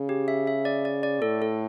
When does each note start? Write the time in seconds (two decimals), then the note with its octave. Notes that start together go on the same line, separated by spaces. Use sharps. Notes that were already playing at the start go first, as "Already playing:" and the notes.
Already playing: C#3
0.09 G4
0.28 E5
0.47 E5
0.65 D5
0.85 D5
1.03 D5
1.22 A2 A4
1.42 A4